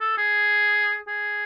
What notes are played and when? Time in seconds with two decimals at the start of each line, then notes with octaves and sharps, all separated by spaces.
0.01 A4
0.18 G#4
1.08 G#4